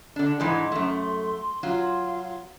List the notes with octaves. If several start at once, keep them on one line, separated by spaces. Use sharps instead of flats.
D3 D4
G#2 E3 G#3 C6
F#2 A3
F#3 F4